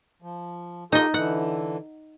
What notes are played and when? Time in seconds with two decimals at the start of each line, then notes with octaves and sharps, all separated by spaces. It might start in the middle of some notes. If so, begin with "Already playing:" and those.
0.22 F3
0.92 D#4 F4 G4 A4 D#5
1.14 D3 E3 F#5